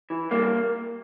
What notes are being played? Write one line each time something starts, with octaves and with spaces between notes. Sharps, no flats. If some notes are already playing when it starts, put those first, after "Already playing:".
E3
G2 A#3